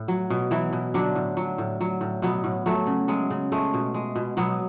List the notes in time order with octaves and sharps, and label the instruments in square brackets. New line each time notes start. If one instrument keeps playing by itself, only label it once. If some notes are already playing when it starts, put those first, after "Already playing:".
Already playing: [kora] A2
F#3
B2
E3 F#3 E4
B2
D3 F#3 D4
A2
F#3
A2
F#3
A2
B2 F#3 B3
A2
F#3 A3
C#3
F#3 G#3
C#3
G#3 A3
B2
G#3
B2
B2 F#3 B3